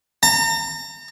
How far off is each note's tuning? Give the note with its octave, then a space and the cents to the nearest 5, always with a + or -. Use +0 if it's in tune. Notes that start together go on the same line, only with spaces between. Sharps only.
A#5 -40